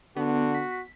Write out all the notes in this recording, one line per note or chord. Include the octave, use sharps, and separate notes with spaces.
D3 B3 F#4
B6